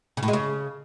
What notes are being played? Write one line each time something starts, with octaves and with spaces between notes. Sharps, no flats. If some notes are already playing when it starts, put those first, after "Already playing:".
C#3
A2
G#3
C#3